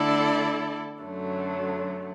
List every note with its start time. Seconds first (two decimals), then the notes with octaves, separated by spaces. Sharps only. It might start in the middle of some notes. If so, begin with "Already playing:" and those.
Already playing: D3 A3 E4 A4 D5
1.02 F#2 D3 F#3 A3